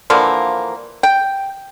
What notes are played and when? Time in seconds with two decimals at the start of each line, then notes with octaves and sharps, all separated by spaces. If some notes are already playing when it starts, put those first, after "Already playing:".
0.10 D3 E3 F3 A#3
1.03 G5